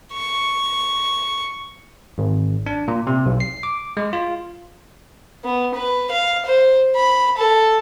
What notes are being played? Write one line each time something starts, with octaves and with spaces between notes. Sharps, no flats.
C#6
G#1
D4
A#2
C3
B1
C7
D6
G#3
F4
B3
B4
F5
C5
B5
A4